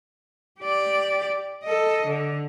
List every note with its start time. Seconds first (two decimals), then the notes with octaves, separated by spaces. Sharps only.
0.60 G4 D5
1.64 A4 D#5
2.06 D3